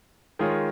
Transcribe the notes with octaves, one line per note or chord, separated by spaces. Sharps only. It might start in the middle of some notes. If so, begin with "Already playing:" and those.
D#3 G#3 F4 G#4 C#5